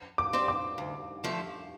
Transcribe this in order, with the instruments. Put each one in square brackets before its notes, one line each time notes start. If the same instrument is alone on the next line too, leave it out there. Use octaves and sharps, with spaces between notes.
[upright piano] D6
[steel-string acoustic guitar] C4 G4 D5
[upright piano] D6
[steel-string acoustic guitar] D2
D3 F3 A3